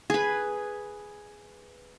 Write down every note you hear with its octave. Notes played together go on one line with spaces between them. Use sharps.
G#4 B4